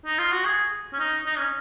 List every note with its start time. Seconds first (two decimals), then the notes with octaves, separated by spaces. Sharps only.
0.06 D#4
0.19 F4
0.32 F#4
0.45 G#4
0.93 C#4
0.99 D#4
1.26 D#4
1.37 C#4